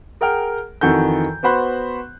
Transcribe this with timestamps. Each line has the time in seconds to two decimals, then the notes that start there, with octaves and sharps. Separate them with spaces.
0.21 G#4 A#4 F#5 G5 F6
0.81 F2 D#3 E3 F#4 A4 G6
1.43 B3 F#4 C5 B5 F#6